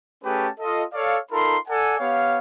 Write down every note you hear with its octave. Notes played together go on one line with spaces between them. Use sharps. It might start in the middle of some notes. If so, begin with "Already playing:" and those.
A3 C#4 G4 G#4 B4 A5
F4 A4 D#5
A4 C#5 D5 F5
D#4 F4 A4 A#4 B5 C6
A4 D5 F#5 G#5
B3 G4 C#5 F5